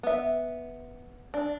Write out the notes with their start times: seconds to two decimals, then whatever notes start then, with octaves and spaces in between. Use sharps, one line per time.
0.03 B3 E5
1.34 D4